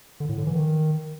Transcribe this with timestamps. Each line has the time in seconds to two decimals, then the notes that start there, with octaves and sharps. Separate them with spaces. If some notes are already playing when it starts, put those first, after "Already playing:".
0.20 D3
0.29 A2
0.38 D3
0.47 E3
0.55 D#3